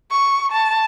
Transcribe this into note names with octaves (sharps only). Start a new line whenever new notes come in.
C#6
A5